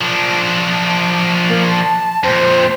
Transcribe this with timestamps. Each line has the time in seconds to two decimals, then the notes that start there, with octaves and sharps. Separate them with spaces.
0.01 F3 D4
1.48 A#3
1.70 A5
2.24 F2 A#2 C5